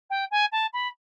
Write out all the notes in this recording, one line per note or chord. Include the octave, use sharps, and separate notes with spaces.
G5
G#5
A5
B5